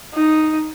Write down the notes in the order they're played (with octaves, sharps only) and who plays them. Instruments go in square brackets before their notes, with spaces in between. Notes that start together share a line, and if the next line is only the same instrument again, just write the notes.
[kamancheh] D#4